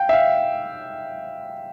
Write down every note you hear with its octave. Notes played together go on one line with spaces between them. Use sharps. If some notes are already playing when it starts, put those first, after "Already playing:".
Already playing: F5 G5
E5
F5